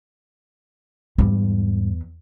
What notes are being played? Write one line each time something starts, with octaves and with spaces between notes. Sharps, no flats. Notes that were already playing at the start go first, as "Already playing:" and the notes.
E2 G#2 G3